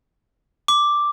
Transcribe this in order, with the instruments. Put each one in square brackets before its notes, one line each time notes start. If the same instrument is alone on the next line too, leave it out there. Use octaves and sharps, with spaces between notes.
[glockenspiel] D6